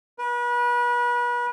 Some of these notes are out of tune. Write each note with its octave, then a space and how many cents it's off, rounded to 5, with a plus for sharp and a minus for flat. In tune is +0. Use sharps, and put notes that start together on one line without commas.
B4 -35